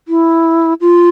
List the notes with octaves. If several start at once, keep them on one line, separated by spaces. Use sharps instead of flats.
E4
F4